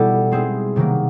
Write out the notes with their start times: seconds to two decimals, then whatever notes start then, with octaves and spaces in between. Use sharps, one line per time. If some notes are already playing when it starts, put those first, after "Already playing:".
Already playing: B2 G3 B3 E4 A4
0.31 G#3 C4 E4 G#4
0.76 C3 D#3 F#3 A#3